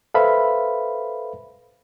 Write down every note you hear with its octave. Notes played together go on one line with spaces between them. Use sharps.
A4 B4 C5 E5 F5 B5